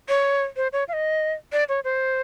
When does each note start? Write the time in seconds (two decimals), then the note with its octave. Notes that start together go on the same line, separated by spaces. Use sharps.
0.09 C#5
0.57 C5
0.73 C#5
0.88 F5
0.93 D#5
1.53 D5
1.69 C#5
1.84 C5